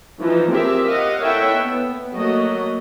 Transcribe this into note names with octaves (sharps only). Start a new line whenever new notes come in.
E3 F3 D#4
C4 G4 G#4 A#4 E5
A#4 D#5 F5 F#5
E4 A4 C#5 E5 F#5 G5
B3
F#3 A3 A#3 F#4 D#5